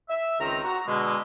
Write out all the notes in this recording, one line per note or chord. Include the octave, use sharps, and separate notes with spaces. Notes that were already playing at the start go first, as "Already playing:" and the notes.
E5
C#2 D#3 C4 A#5
F#4 A#5
B2 D3 G#3